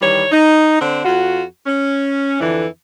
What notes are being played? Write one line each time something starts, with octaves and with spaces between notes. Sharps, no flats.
D#3 E3 G3 C#5
D#4
D3 C4 D4
F2 F4 F#4
C#4
F2 D3 E3